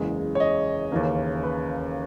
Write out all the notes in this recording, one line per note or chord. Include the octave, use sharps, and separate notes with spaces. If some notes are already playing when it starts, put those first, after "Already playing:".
Already playing: F#1 E2 C#3 G#3
C#5
D#5
D#2 C#3 E3 A#3 C#4
B4